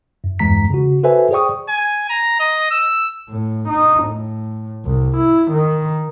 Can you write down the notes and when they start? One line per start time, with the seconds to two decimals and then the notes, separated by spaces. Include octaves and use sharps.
0.24 F#2
0.39 E2 G2 E3 G#3 A#5 B6
0.70 C#3 F#4
1.03 F#4 A4 B4 C5 E5 G#5
1.31 G#4 C5 D5 G5 C#6 D#6
1.69 G#5
2.09 A#5
2.40 D#5
2.71 E6
3.29 A2
3.68 D#4
4.04 A2
4.86 C2
5.17 E4
5.52 D#3